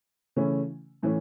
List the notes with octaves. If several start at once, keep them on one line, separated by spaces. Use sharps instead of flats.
C#3 E3 A3 C#4 E4
A2 E3 A3 C#4